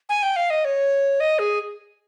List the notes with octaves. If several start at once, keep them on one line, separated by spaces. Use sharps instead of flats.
G#5
G5
F5
D#5
C#5
D#5
G#4